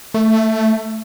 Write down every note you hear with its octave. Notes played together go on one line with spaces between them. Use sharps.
A3